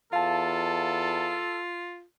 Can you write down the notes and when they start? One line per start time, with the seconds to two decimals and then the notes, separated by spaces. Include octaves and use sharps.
0.13 E2 F4 A4 F5 A5